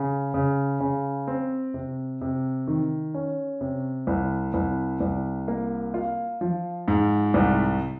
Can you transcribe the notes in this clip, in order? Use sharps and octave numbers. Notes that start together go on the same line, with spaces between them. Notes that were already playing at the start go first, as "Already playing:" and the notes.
Already playing: C#3
C#3
C#3
C4
C3
C3
D#3
C#4
C3
C2
C2
C2
A#3
F4
F3
G#2
C2